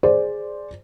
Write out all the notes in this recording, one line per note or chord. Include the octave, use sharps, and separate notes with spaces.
G#4 C5 D5